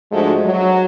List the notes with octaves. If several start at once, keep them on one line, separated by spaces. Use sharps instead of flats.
G#2 F3 G#3 A3 D4 F#4
F#3